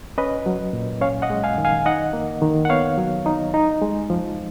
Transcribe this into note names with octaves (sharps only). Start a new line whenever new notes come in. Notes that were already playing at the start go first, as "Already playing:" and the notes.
C#4 B4 D#5
F#3
A#2
C#4 C#5 F5
D#5 F#5
G#3
F5 G#5
D#3
F5 G#5
D#4 D#5 F#5
A#3
D#3
F#5
B3 C#5 F5
F#3
D#4
D#4
G#3
F3